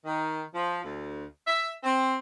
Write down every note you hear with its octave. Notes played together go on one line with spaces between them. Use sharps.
D#3
F3
D2
E5
C4